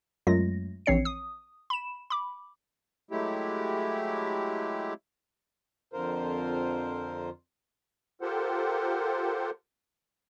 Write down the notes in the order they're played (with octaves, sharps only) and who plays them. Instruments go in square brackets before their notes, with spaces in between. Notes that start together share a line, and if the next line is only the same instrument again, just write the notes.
[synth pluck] F#2 F#3 G#3 A3 F4 A#6
A#1 E3 C4 C#5 C7 C#7
D#6
B5 E7
B5 D6
[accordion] F#3 G#3 A3 E4 G4
[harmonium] F2 D3 F4 A#4 C5
[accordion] F4 G4 A4 A#4 C5 F#5